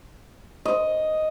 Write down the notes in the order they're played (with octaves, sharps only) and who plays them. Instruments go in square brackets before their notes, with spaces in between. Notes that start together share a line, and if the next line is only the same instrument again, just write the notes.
[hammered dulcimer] D#5